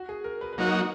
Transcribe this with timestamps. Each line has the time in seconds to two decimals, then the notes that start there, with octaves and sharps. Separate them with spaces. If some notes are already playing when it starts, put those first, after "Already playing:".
Already playing: F#4
0.09 G#4
0.24 A#4
0.41 B4
0.53 B4
0.58 F#3 A#3 D#4 F#4 A#4